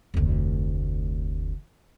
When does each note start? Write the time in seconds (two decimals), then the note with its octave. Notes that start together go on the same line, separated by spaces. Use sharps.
0.14 F1 D2